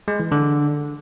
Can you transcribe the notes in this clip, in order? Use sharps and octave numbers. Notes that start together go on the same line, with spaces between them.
G#3
E3
D3